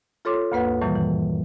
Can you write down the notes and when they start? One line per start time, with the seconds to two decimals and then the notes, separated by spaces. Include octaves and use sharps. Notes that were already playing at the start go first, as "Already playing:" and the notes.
0.25 F4 A4 C#5 C6 D6
0.52 D2 G2 A#3 B4 F#5
0.81 F#2 A#2 D#3 E3 G3
0.96 E3